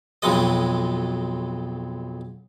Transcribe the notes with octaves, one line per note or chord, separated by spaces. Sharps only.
B1 F2 B2 F#3 G#3 D#5